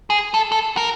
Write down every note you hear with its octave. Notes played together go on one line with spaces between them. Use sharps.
G#4
A4
A4
A#4